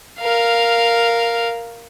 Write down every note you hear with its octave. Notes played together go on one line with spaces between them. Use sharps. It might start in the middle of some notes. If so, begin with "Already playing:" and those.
A#4 F5